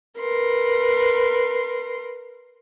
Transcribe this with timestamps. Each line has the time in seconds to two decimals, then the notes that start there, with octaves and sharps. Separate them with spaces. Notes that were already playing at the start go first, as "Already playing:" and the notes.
0.19 A#4 B4 C6